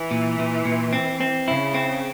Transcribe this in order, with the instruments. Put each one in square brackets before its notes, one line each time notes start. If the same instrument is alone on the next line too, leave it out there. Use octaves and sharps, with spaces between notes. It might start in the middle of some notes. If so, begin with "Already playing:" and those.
Already playing: [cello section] E3
[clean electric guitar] A#2
A#2
A#2
C4
C4
[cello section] C#3 [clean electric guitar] E4
[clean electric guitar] C4